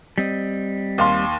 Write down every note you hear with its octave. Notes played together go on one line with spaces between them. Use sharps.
G3 C4 D#5
D#2 F5 C6